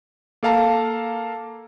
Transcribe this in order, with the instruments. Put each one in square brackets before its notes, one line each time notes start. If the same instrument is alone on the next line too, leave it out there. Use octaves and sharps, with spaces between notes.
[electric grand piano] A#3 A4 F5 A5 A#5